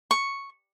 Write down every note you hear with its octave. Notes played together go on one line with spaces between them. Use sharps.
C#6